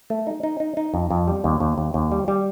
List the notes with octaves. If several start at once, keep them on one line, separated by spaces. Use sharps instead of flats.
A3
D#4
D#4
D#4
D#4
F2
F2
G3
D#2
D#2
D#2
D#2
G3
G3